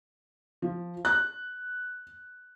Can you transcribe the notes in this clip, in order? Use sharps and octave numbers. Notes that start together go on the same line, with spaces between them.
F3
F#6